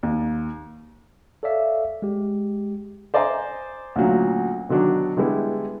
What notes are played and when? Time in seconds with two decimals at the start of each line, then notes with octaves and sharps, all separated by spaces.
0.03 D#2
1.43 A4 C#5 D5 E5 F5
2.02 G#3 G4
3.14 C5 D5 D#5 G#5 A#5 C6
3.96 D2 A#2 F#3 C#4
4.69 B2 D3 D#3 F#3 D4
5.17 D3 G3 G#3 B3 E4